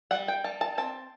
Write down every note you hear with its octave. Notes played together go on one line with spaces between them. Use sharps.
G3 F#5
G5
G3 A5
A5
C4 A5